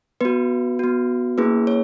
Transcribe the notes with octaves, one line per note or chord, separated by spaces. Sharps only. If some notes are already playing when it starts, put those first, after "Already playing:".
B3 F#4 B4
B3 F#4
A#3 C#4 E4 G#4 B4
C#5